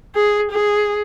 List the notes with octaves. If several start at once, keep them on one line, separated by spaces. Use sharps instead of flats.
G#4
G#4